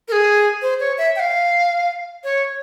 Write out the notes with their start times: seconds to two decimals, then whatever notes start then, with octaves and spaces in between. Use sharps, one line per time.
0.08 A#4
0.12 G#4
0.62 C5
0.80 C#5
0.98 E5
1.16 G5
1.20 F5
2.24 C#5